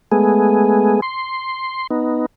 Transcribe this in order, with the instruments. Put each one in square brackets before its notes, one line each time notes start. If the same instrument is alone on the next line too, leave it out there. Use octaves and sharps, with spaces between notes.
[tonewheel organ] G#3 A3 B3 G#4
C6
B3 D#4